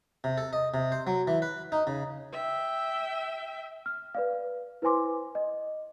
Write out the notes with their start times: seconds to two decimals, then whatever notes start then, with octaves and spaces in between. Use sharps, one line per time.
0.24 C3
0.38 A4
0.53 D#5
0.74 C3
0.92 C5
1.07 F#3
1.27 E3
1.42 B4
1.72 D#4
1.87 C#3
2.33 E5 G5
3.86 F6
4.15 B4 D5 F5
4.82 E4 B4 C5 G#5 C6 D6
5.35 D#5